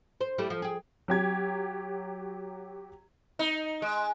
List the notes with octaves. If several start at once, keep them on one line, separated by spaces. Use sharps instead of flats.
C5
G3 A3 E4
F3
G4 G#4
F#3 G4 G#6
D#4
G#3